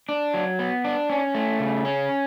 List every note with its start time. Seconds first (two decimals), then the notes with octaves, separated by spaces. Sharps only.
0.09 D4
0.34 F#3
0.59 B3
0.85 D4
1.10 C#4
1.35 A3
1.60 C#3
1.85 C#4